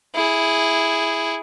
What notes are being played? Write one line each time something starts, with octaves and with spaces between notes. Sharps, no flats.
E4 G#4